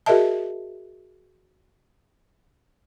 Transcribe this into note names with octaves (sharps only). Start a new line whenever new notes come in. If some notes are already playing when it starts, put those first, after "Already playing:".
F#4 G#4 A#4 D#5 E5 A5